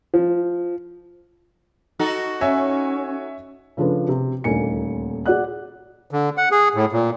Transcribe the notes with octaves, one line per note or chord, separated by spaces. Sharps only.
F3
D#4 F#4 A4
C#4 C#5 E5 G#5
C#3 F3 D4 A4 B4
C3
D#1 D2 A#3 D#4 G#5 C#7
F#4 G#4 D5 F#5 F#6
D3
F#5
G#4
A2
A#2